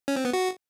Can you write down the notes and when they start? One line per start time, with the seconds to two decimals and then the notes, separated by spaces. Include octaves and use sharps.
0.08 C#4
0.16 C4
0.25 B3
0.33 F#4